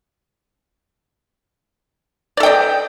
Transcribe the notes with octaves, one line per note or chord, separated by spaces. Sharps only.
A4 D5 D#5 G5